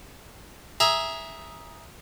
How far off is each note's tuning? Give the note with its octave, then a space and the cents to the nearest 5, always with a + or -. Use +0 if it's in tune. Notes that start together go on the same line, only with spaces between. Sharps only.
G#4 +0 E5 +0 A#5 +15